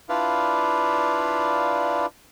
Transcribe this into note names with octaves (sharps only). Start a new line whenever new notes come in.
D4 E4 F4 B4 D5 F5